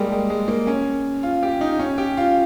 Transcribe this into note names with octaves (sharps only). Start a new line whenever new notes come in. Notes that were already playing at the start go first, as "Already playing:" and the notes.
Already playing: G3 G#3 A#3
G#3
G#3
A#3
C#4
F4
G4
D#4
C#4
G4
F4